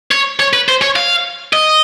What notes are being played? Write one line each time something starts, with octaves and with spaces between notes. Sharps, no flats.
C#5
C#5
B4
C5
C#5
F5
D#5